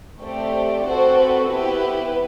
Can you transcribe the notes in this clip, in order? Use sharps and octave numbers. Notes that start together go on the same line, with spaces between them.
A3 C4 G4 D5
C4 F#4 A4 C5
B4
B3 E4 G4 B4